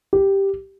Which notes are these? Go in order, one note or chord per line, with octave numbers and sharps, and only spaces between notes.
G4